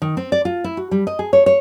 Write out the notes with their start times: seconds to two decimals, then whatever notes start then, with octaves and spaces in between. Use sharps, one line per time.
0.02 D#3
0.17 C4
0.32 D5
0.45 F4
0.64 E4
0.77 F#4
0.91 G3
1.07 D#5
1.19 G#4
1.33 C#5
1.46 C#5